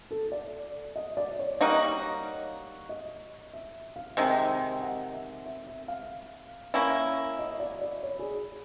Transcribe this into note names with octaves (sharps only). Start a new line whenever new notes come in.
A4
D5
D#5
D5
C#5
G3 A#3 D#4 F#4
D#5
E5
F5
C3 D#3 G#3 G5
F#5
E5
E5
E5
F5
A#3 C#4 E4
D#5
D5
D5
C#5
G#4